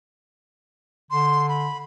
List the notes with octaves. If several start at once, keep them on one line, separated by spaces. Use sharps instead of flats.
D3 C6
B5